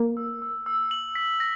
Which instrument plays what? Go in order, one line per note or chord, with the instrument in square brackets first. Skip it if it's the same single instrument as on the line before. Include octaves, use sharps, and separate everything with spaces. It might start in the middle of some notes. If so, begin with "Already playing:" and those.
Already playing: [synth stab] A#3
[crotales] E6
E6
E6
F#7
B6
A#6